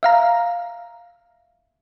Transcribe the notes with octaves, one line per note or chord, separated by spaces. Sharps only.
E5 F5 A#5